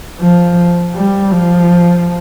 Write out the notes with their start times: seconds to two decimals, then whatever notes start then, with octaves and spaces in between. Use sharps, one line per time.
0.21 F3
0.95 G3
1.31 F3